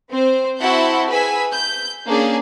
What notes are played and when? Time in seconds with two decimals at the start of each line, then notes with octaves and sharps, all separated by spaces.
0.11 C4 C5
0.58 C4 E4 F#4 F#5 A5 G6
1.10 G#4 B4 G#5 E6 B6
1.53 G6
2.05 A#3 C#4 D4 G#4